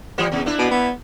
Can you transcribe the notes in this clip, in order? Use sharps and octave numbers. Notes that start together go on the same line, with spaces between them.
E3 G3 A#3
E2 C3
A#3 D4 E4
B2
B3